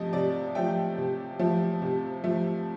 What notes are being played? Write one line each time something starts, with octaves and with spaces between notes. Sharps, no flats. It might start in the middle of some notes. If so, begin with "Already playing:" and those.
Already playing: C3 F3 A3 D#5
C3 D5
F3 A3 G5
C3
F3 A3
C3
F3 A3